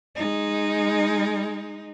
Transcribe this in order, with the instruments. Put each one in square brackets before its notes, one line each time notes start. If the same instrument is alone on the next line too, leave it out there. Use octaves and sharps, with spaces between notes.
[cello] G#3 D#4